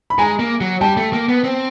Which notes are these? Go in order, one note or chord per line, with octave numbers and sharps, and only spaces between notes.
B5
G#3 G#5 A#5
A#3
F#3
G3 G5 A5
A3
A#3
B3
C4